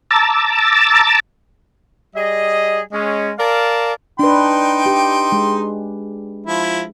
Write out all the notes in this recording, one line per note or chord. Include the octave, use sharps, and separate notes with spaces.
A5 A#5 D6 E6 A6
G3 G#4 D#5
G#3 C#4
A#4 D5 F5 A5
D4 D#4 B4 G5 C6
G4
G#3
F3 E4